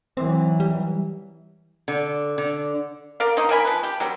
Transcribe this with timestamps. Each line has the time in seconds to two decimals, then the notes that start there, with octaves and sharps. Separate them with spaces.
0.17 E3 F#3 C4
0.60 G3
1.88 D3
2.38 D3
3.20 A#4 D5 F5
3.37 A#3 D#4 D#5 C6
3.49 A#3 A#4 G#5 B5
3.65 F3 B4
3.83 G4
4.00 F#3 G3 C4